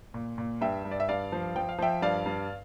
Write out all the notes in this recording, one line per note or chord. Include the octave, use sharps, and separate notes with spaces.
A#2
A#2
G2 E5 G5
G2
D5
E5
G2 D5 F5
F3
F3 G5
F5
F3 E5 G5
G2 D5 F5
G2